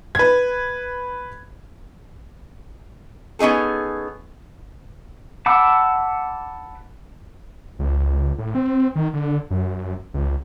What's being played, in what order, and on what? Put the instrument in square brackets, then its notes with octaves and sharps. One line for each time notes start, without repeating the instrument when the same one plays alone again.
[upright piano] B4 G#6
[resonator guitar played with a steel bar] B3 C#4 D#4 G#4 A4
[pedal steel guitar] F#5 A5 B5 D6 E6
[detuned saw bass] C#2
A2
C4
D#3
D3
F#2
C#2